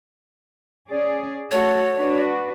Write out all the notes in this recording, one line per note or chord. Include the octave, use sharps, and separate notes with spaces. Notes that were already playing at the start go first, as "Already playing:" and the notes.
C#4 G#4 D5
A3 F#4 A4 C#5
D4 F#4 B4